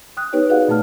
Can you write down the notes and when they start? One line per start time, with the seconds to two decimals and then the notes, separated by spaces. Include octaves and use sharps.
0.17 G5 D#6 F#6
0.33 B3 D#4 G4 B4 C#5 G5
0.49 F#4 G#4 B4 D5 F5 F#5
0.68 A#2 A3 A5 F6